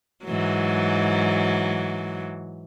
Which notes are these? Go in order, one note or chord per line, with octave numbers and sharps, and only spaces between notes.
G#2 E3 F#3